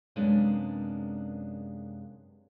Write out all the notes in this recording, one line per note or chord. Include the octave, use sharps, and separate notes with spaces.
F#2 C3 G#3 A#3 B3 D4